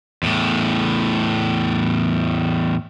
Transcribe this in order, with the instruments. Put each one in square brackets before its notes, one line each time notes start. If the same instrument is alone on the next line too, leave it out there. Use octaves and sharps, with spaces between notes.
[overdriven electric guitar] E2 A2